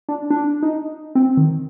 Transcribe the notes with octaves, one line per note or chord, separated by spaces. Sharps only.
D4
D4
D#4
C4
D#3